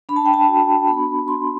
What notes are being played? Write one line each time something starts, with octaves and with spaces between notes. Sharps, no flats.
D4 B5
A5
G5
A5
F#4
B3 B5
F#4 C6